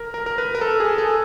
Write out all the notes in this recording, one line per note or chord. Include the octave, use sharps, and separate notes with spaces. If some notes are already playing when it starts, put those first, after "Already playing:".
Already playing: A#4
A#4
A#4
B4
A#4
A4
G#4
A4